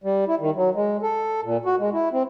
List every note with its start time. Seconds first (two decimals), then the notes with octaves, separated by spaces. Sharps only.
0.04 G3
0.28 E4
0.40 D#3
0.56 F#3
0.74 G#3
1.02 A4
1.43 A#2
1.65 F#4
1.79 G#3
1.93 E4
2.12 C4